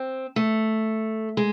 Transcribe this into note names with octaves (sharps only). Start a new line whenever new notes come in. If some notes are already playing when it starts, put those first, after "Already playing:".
Already playing: C4
A3
G#3